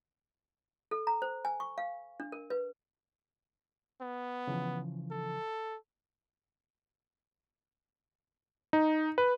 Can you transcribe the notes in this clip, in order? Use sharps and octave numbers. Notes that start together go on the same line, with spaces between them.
A4
A#5
C5
G#5
C#6
F5
D4
A#4
B4
B3
C#3 E3 F3
A4
D#4
B4